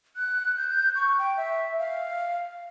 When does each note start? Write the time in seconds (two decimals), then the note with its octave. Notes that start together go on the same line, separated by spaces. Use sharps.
0.17 F#6
0.57 G6
0.96 C#6
1.19 G5
1.37 E5
1.79 F5